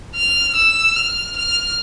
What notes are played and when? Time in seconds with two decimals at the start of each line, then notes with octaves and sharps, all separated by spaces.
0.15 F6
0.56 E6
0.96 F6
1.36 F6